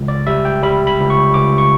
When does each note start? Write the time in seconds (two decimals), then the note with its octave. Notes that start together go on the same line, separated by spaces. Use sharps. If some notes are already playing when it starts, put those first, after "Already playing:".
Already playing: C#2
0.08 D5
0.27 G3 E5
0.45 G5
0.63 G3 B5
0.87 B5
0.99 C#2
1.10 C#6
1.34 C#2 D6
1.58 C#6